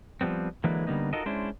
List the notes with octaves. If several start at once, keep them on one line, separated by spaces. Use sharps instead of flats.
F3 G3 B3 C4
D3 E3 F#3 G#3 A#3 B4
D3 G3 A#3 B3 D#4
D#4 F4 F#4 A4 A#4 D#5
G#3 C#4 D4 E4 C5